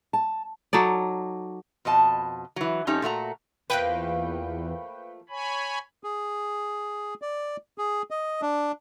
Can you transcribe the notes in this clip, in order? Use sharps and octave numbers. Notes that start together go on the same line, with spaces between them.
A5
F#3 D#4 A4 D5
F2 B2 D#5 A5
E3 F#3
F2 A3 C#4 D#4 G4
A#2 A3 F#4 A#5
E2 F3 A3 A#3 B4 G5
C#5 G#5 B5
G#4
D5
G#4
D#5
D4